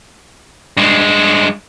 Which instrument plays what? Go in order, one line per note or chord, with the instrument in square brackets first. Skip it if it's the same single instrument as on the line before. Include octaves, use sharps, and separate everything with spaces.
[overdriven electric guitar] G2 G#3